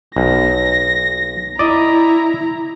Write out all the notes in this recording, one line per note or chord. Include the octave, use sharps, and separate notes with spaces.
B1 A#6
E4 D5 D#5 A#5